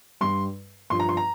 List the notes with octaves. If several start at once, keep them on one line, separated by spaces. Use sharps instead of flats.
G2 G3 C6
G2 F3 C6
A#5
C6
A#5